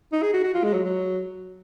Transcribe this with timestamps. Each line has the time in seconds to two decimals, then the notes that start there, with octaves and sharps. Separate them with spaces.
0.13 D#4
0.22 G#4
0.34 F#4
0.44 F#4
0.54 F4
0.63 G#3
0.73 F#3
0.84 F#3